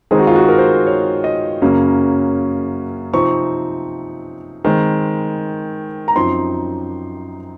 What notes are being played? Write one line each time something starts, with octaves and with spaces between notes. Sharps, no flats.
D#3 G#3 C4 D#4 G#4
F#4
F4
F#4
A#4
C5
A#4
C#5
D#5
F#2 C#3 F#3 A#3 C#4
C3 F3 C4 D#4 C#6
D#3 G#3 C4
A#5
F#2 F3 C4 D#4 C6